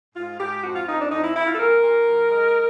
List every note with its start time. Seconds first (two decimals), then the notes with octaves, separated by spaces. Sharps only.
0.15 G#2 F4
0.39 G#2 G4
0.63 F2 F#4
0.75 F4
0.88 F2 D#4
1.00 D4
1.11 F2 D#4
1.23 E4
1.35 F2 E4
1.47 F4
1.54 A4
1.59 A#2 A#4
1.83 A#2
2.07 F#2
2.31 G#3